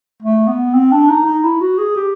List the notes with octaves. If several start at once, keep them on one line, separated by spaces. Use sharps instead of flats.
A3
B3
C4
D4
D#4
D#4
E4
F#4
G#4
G4